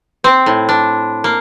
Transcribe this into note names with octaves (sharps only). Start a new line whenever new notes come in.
C4
A2
D4
A#3